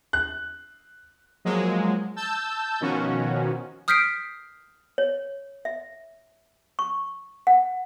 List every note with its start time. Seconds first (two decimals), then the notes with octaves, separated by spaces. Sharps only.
0.13 F#6
1.45 F3 F#3 G#3 A#3
2.16 A5 E6 G6
2.80 B2 D#3 F3 C#4 F#4
3.88 D#6 F6 G6 B6 C7 D7
4.98 C#5
5.65 E5
6.79 C#6
7.47 F#5